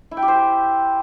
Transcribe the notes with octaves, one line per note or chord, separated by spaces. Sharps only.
E4
G5
G4
C5